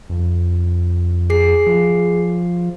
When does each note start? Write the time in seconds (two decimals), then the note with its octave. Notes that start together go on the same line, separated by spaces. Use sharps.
0.10 F2
1.30 G#4 C7
1.67 F3